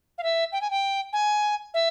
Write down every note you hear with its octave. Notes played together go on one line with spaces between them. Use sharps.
F5
E5
G5
G#5
G5
G#5
E5